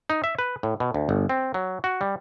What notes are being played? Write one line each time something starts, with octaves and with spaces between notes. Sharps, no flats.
D#4
E5
B4
A2
B2
D2
G1
C4
F#3
F#4
G3